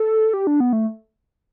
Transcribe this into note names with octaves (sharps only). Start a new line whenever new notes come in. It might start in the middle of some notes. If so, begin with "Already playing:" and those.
Already playing: A4
G4
D4
B3
A3